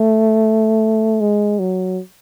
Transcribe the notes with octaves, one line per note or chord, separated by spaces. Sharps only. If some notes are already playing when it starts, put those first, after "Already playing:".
Already playing: A3
G#3
F#3